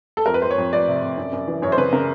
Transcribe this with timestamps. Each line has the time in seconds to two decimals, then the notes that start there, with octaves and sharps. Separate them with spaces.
0.17 A4
0.26 F2 A#4
0.34 B4
0.42 F2 C5
0.50 C#5
0.58 F2
0.73 F2 D5
0.88 C3
1.03 C3
1.18 F#2
1.32 F#2
1.48 E3
1.62 F#2 C#5
1.72 C5
1.77 C#3 B4
1.93 C#3 A#4